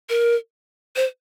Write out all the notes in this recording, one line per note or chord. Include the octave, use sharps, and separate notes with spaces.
A#4
C5